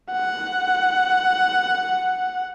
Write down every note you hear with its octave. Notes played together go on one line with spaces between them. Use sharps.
F#5